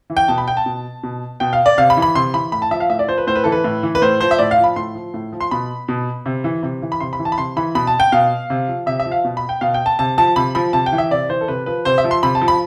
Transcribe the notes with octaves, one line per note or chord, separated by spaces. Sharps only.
E3
G5
B2 A5
B5
G5
A5
B2
B2
B2 G5
F5
D5
C3 F5
B5
E3
B5
C3 C6
E3 B5
A2 B5
A5
F3 E5
F5
A2 E5
D5
F3 C5
B4
A2 C5
B4
E3 A4
B4
A2
E3
B4
A2 C5
F3 C5
E5
A2 D5
F5
F3
B5
A2 C6
F3
A2
F3
C6
B2 B5
B2
C3
E3
C3
E3
B5
C3 C6
B5
E3
A5
B5
C3 C6
E3 B5
B2 B5
A5
G5
B2 F5
C3
F3
C3 E5
E5
F3
F5
B2
B5
G5
B2 F5
G5
A5
C3 A5
F3 A5
C3 B5
F3 B5
C3 A5
G5
E3
E5
C3 D5
E3 C5
A4
C3 B4
F3 B4
C3 C5
E5
F3
C6
C3 B5
A5
F3
B5